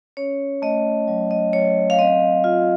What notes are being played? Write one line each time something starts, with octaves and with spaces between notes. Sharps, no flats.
C#4 C#5
A3 D#5
F#3
D#5
F#3 C#5
F5
C4 D#5
F4